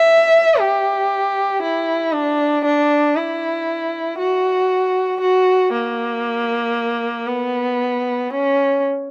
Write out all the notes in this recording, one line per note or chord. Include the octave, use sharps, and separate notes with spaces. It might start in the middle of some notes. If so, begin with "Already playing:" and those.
Already playing: E5
G4
E4
D4
D4
E4
F#4
F#4
A#3
B3
C#4